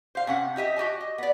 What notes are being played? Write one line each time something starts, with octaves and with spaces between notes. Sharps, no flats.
C5 F5
C3 C#4 F#5
D#4 G4 D#5 E5
F#4 G4 D#5 G#5
D#5
B3 D5